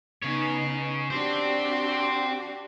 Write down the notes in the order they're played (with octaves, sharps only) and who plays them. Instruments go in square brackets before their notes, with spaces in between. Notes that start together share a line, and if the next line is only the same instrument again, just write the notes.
[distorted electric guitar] C#3 C#5 [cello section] B3 D#4
[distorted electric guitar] C4 C5 [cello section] D4 F#4 G4